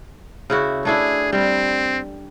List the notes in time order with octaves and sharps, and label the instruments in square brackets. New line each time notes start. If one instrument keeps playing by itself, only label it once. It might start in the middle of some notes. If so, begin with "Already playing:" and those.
[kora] C#3 E4 F#4
[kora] A3 D4 E4 [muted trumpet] G#4
[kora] G3 [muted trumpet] C4